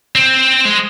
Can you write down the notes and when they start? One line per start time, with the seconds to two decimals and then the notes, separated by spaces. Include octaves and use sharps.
0.15 C4
0.65 G#3